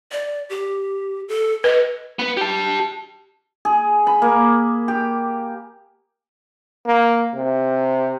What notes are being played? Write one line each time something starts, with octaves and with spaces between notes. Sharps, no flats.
D5
G4
A4
B4 D#5
B3 B4
G4 A5
G#4
B5
A#3
G4
A#3
C3